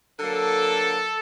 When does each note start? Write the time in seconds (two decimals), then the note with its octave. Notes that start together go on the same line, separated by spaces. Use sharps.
0.19 D3 F#3 A#3 A4